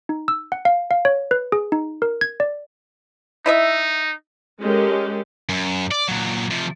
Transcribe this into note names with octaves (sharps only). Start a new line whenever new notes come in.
D#4
E6
F#5
F5
F5
C#5
B4
G#4
D#4
A#4
G#6
D5
D#4 E4 D#5 E5
G#3 C#4 G4 A4 A#4
F#2
D5
A#2 F#3
C3 F3